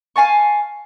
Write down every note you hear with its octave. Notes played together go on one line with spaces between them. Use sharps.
F5 G#5 A5 C#6